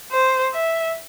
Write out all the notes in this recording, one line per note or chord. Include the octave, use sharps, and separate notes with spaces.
C5
E5